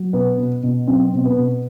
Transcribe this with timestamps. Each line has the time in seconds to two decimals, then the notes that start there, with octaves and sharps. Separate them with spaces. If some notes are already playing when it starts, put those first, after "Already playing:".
Already playing: F#3
0.13 B2 B3
0.38 B2
0.63 B2
0.87 F#3 C4
1.13 B2
1.25 B3
1.38 B2